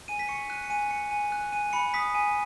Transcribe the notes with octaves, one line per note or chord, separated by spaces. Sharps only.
G#5 D#7
B6
C#6 C#7
F#6 D#7
C#7
G#5 D#7
G#5 C#7
G#5 D#7
F#6
G#5 D#7
B5 C#7
D#6 B6
G#5 D#7